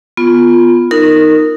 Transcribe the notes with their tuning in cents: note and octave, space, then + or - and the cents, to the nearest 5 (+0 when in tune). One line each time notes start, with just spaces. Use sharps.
B3 +0 F4 +0
D#4 +0 A#4 -15